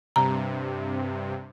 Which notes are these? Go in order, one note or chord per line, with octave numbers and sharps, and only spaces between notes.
G2 C3 A#5